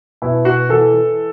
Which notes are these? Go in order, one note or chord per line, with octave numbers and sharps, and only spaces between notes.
B2 E4
B2 F#4
E3 A4
E3